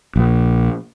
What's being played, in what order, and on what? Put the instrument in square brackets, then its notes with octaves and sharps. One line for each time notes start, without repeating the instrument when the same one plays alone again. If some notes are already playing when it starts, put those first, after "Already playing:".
[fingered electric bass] A#1 A#2